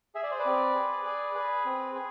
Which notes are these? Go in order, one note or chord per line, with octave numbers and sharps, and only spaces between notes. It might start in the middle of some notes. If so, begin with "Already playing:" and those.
G#4 E5
D5
C5
B4 D5
C4
G#4
G#4
G#4 B4
C4
G#4